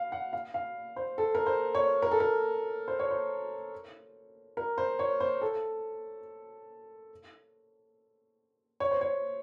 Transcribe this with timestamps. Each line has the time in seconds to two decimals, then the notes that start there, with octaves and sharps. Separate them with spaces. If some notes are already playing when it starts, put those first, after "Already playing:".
Already playing: F5
0.12 F#5
0.33 F5
0.54 F5
0.96 C5
1.18 A4
1.35 A#4
1.46 C5
1.75 C#5
2.02 A#4
2.11 A4
2.20 A#4
2.88 C5
2.99 C#5
3.11 C5
4.57 A#4
4.78 C5
4.99 C#5
5.20 C5
5.42 A4
8.80 C#5
8.91 C5
9.01 C#5